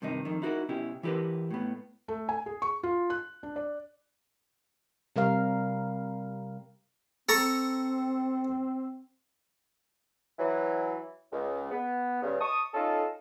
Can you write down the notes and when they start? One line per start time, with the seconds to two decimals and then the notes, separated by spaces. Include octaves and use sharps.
0.02 G2 C3 D#3 D#4
0.25 F2 D#3
0.42 D#4 E4 F#4 G4 A#4
0.69 B2 C#4 E4 G4
1.03 E3 E4 G4 A#4 B4
1.51 A2 B3
2.08 A3
2.29 G#5
2.46 G#4
2.62 C#6
2.83 F4
3.10 F#6
3.43 D4
3.56 D5
5.16 C3 G3 A#4 F5
7.29 C4 A4 A#5 C#6
10.39 E3 F#3
11.32 C#2
11.71 B3
12.22 G2 C#3
12.41 A5 C#6 D#6
12.74 C#4 D#4 F4 A4